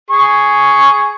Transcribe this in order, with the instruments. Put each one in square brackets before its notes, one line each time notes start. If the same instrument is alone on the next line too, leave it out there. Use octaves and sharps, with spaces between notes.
[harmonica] G#4 C#6